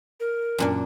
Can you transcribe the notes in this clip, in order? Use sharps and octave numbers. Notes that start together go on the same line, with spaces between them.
A#4
F#2 A#2 D4